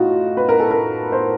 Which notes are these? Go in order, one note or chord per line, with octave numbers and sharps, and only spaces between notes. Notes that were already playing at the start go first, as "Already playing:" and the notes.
Already playing: A2 D#4 F4 F#4
B4
A#4
A4
A#4
C5